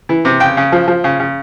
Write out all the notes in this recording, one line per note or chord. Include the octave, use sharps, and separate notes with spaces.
E3
C3
C#3 G5
C#3
F3
F3
C#3
C#3